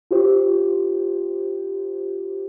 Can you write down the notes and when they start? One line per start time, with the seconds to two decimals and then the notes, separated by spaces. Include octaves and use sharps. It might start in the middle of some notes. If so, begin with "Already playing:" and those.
0.11 F4 G4 C5